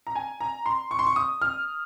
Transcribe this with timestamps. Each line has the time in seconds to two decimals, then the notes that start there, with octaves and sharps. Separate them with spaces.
0.07 A#5
0.16 G#5
0.41 A#5
0.66 C6
0.91 C#6
0.99 C6
1.07 C#6
1.16 D#6
1.42 F6